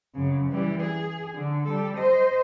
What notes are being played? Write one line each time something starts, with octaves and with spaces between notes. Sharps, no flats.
F#2 C#3
E3 G3
G#4
D3
G3 A4
C5 D#5